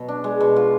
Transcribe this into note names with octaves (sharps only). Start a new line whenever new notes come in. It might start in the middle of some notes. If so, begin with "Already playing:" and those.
Already playing: B2 F#3
D4
G#3
B2
F4